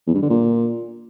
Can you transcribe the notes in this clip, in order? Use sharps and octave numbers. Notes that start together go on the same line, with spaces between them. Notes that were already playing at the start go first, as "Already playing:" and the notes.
E2
G2
D3
A#2